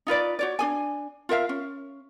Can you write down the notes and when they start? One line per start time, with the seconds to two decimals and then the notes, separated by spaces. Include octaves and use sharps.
0.07 D#4 F4 B4 D5
0.39 F#4 C#5 D5
0.59 D4 G#4 G#5
1.29 F4 A#4 E5 F5
1.49 C#4